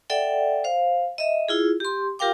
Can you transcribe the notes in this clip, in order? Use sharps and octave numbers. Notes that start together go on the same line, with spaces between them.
A4 D5 E5 F#5 G5
C5 F5
D#5 E5
E4 F4 G#4
G4 C6
F4 G4 A#4 F5 G5 D6